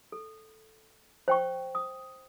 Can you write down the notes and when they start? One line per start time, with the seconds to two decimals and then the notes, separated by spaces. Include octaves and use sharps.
0.12 A4
1.28 C5 G5 C#6
1.75 D#6